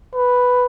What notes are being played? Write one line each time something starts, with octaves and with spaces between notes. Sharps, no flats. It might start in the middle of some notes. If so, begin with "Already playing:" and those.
B4